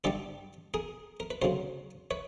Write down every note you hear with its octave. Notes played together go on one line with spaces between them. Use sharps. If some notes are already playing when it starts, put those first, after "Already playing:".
G2 D3 G3 G4 A4
G#4 A#4
A#4
B4
D2 C#3 F#3 A#4 C5
B4 C#5